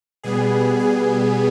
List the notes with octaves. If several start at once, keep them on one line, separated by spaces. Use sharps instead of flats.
B2 G3 B3 G#4
G#4